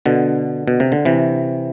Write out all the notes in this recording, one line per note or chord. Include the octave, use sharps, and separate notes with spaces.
B2 D3
B2
C3
D3
C3 E3